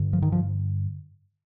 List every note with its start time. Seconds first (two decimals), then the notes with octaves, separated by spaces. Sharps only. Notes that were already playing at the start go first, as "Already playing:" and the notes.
Already playing: G2 D3
0.13 F3
0.22 D#3
0.32 F3